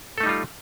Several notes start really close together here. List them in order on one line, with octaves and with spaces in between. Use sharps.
A4 A3 D#4 G3 F4